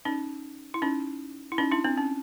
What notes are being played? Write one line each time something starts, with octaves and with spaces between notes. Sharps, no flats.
C#4 D#4
E4
C#4 D#4
E4
C#4 D#4
D4 E4
C4 D4
C#4